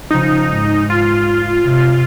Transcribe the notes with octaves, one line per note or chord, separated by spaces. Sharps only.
C#3 F3 D#4
G#2
F4
C3